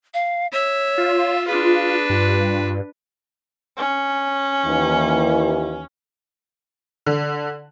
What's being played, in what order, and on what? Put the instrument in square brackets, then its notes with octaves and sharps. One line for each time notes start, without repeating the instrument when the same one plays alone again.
[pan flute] F5
[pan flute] C#5 [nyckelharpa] E5
[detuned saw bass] F4
[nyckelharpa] D4 B4 [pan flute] G#4
[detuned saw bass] G2 [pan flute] F4
[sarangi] C#4
[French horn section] D#2 E3
[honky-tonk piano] D3